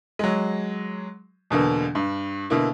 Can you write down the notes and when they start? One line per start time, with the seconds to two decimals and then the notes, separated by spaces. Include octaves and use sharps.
0.19 F#3 G#3
1.50 E2 B2 D3 A#3
1.95 G2
2.50 B2 D3 A#3 E4